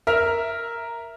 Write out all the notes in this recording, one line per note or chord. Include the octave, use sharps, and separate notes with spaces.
A#4 E5 F6